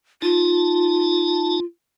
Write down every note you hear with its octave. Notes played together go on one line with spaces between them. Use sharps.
D#4 F4 A5